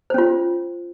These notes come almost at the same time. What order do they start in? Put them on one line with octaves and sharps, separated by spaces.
C5 C#4 F4